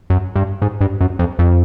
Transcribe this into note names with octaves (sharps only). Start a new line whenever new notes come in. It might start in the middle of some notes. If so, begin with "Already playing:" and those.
F#2
G2
G#2
G2
F#2
F2
F2